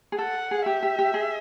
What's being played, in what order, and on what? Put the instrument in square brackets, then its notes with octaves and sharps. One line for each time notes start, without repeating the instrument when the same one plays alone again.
[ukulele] G#4
[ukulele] A4 [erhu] F#5
[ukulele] G#4
[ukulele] G4 [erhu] E5
[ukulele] G4
G4
G#4